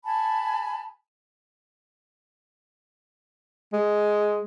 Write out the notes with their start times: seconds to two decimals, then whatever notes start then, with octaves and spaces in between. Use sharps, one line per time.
0.05 G#5 A5 B5
3.73 G#3